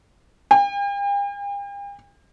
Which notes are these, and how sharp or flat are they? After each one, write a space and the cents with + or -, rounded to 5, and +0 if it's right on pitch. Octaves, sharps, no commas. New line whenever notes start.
G5 +45